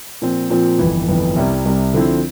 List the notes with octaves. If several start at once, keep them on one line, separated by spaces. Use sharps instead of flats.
A#2 F3 C4
A#2 F3 C4
G1 F2 E3
G1 F2 E3
C2 C3 G3
C2 C3 G3
D3 F3 C4 E4